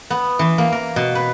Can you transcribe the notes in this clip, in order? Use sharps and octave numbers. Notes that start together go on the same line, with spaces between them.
B3
E3
A#3
A#4
B2
B4